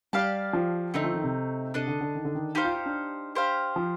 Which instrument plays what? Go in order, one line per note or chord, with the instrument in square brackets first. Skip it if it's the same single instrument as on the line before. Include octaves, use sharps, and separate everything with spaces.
[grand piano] G3 [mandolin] G4 D5 F5 A5
[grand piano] F3
[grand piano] D3 [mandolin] A3 C4 D#4
[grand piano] F3
D#3
C3
[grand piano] C3 [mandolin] D4 A4 D#5
[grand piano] D3
D3
D#3
D3
D#3
[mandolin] D#4 G4 C5 F5
[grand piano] F4
F4
D4
[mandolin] G4 C5 F5
[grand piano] F3